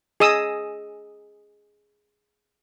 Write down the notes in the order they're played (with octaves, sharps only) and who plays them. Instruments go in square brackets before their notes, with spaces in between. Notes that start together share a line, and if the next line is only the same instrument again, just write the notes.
[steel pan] G#4 D#5 D#6 E6